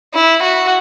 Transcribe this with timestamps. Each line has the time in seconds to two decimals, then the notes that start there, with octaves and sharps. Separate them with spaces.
0.15 E4
0.43 F#4